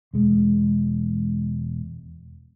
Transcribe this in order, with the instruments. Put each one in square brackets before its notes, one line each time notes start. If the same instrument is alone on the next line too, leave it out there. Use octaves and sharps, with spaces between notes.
[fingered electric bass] E1 G#3